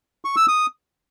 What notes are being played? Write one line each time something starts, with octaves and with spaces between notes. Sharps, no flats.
C#6
E6
D#6